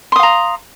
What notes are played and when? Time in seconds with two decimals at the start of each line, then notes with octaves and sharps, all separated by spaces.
0.12 C6
0.16 D#6
0.19 F5
0.23 A#5